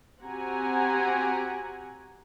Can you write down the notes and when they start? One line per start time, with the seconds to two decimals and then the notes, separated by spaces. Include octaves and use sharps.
0.24 C4 F#4 G4 F#5 G#5 A#5